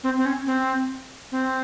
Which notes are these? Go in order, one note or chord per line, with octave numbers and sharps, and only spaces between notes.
C4
C4
C#4
C4
C4